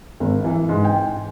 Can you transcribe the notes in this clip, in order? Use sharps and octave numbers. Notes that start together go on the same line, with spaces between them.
G#1
E3
G#2
G5